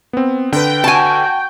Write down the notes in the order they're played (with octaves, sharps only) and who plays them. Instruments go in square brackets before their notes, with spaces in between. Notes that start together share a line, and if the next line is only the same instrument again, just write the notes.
[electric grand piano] B3 C4
[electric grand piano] D3 B4 [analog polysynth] G5
[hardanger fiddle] F#4 [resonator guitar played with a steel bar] G#5 A5